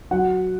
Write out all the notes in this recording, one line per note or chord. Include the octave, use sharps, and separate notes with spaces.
F#3 F#5